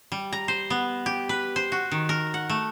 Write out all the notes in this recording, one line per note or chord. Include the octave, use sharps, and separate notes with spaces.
G3
A#5
C5
B3
G4
B4
C5
F#4
D#3
A#4
F#5
A3